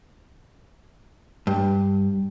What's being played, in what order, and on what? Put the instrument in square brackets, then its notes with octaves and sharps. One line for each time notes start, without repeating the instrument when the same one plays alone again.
[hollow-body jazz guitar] G2